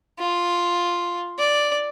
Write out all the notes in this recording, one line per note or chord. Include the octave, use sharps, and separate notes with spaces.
F4
D5